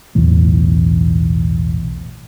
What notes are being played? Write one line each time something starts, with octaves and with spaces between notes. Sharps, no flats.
E1 B1 E2 A2